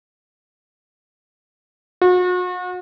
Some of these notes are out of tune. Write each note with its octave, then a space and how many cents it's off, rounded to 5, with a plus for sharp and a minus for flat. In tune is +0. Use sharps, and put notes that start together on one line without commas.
F#4 -40